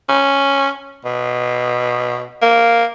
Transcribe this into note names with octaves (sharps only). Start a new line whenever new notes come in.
C#4
B2
A#3